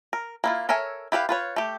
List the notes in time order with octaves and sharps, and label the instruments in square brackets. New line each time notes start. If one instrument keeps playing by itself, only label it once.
[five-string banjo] A#4
A#3 E4 F4
A4 A#4 C#5 E5 G#5
E4 G4 B4 F5
F4 B4 C#5
A3 G4